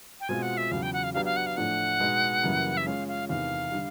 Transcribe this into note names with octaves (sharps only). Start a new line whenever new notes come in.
G5
B2 G#3 C4 F4 G#5
F#5
E5
E2 C#3 F#3 F5
G5
F#5
F5
F#3 B3 D4 G4 F5
F5
F#5
F5
A2 F3 A3 D4 F#5
B2 G#3 B3 D#4
F#2 C#3 E3 G3 A#3
E5
G#3 C#4 F4 F5
F5
E2 C3 D#3 F5
D3 G3